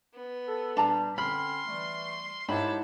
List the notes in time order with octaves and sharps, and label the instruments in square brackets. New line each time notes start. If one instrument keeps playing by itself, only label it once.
[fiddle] B3
[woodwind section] A4
[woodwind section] A#2 G3 [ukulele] D4 A5 A#5
[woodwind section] D3 C4 C#4 [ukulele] B5 [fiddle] C6 [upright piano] F6
[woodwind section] E3 G3 A3
[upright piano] G#2 E4 [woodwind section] G4 A#4 C#5 [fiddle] E5 A5 [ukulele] B5